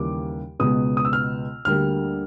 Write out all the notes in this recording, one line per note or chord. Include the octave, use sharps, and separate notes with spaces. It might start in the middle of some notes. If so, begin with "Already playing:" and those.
Already playing: D#2 C#3 E3 G3 A#3 D6
C#2 B2 G#3 B3 D#6
D#6
E6
F6
D2 D3 G3 A#3 F6